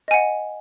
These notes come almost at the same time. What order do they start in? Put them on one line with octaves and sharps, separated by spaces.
D#5 G#5 F#5